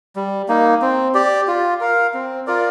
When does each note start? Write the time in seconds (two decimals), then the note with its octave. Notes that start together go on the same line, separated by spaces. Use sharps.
0.16 G3
0.48 A#3 D#4
0.82 C4
1.15 G4 D5
1.48 F4
1.80 A#4 F5
2.14 C4
2.47 F4 A#4 D5